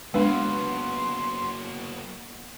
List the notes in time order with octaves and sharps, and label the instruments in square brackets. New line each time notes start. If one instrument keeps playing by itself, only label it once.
[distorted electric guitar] F#3 A#3 [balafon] G#3 D4 [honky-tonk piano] B3 [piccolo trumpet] C6